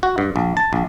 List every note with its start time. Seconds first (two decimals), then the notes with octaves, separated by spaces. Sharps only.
0.03 F#4
0.18 G2
0.36 A#1
0.57 A5
0.73 A#1